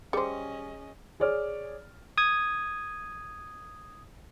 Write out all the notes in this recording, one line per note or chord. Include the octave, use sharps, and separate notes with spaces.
G3 C#4 G#4 C5 D#5
G#4 C#5 D5 F6
D#6 G#6